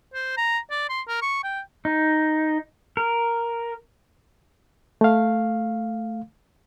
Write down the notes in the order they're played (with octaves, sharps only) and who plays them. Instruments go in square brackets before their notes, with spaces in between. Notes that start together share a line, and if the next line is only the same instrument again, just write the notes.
[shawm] C5
A#5
D5
C6
A#4
C#6
G5
[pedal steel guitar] D#4
A#4
[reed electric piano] A3 F5